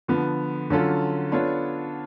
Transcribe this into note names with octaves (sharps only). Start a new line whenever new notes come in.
D3 F3 B3
D3 F#3 C#4 F4 A4
B3 D4 F4 A4 C#5